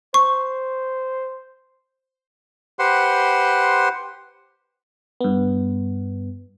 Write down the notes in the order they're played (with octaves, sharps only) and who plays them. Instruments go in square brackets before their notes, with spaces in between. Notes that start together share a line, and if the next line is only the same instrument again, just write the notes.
[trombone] C5 [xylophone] C#6
[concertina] G4 B4 C5 F#5 C6
[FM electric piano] G2 B3